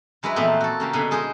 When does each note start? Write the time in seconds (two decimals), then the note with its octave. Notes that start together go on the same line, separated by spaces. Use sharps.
0.23 F#3 G#3 E4 F#4 B4
0.36 A#2 E3 F3 A3 B3 C4
0.61 F#4 A4
0.80 C#3 A#3 G4
0.93 B2 D3 G#5 B5 C6
1.11 G#3 G#4 B4 C5 D#5